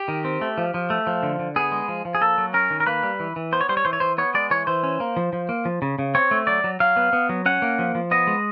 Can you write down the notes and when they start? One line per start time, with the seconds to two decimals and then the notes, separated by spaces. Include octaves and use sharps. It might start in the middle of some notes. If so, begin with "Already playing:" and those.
Already playing: G4
0.08 D#3
0.25 C4
0.41 A3
0.58 F3
0.74 F3
0.90 A3
1.07 F3
1.23 D3
1.39 D3
1.56 B3 G#4
1.72 G#3
1.88 F3
2.05 F3
2.15 G#4
2.21 A#3 A4
2.38 F#3
2.54 C#4 A#4
2.70 D#3
2.80 A#4
2.86 A#3 B4
3.03 G3
3.20 E3
3.36 E3
3.52 B3 C5
3.61 C#5
3.69 G3 C5
3.77 C#5
3.85 E3 C5
3.93 C#5
4.00 E3 C5
4.18 B3 C#5
4.34 G#3 D5
4.51 E3 C#5
4.67 E3 C5
4.83 C#4
5.00 A#3
5.17 F3
5.33 F3
5.49 A#3
5.65 F3
5.82 C#3
5.99 C#3
6.15 C4 C#5
6.31 A3
6.47 F#3 D5
6.64 F#3
6.80 F#3 F5
6.96 B3
7.13 B3
7.29 F#3
7.46 C#4 F#5
7.62 A#3
7.79 F3
7.95 F3
8.11 B3 D#5
8.27 G#3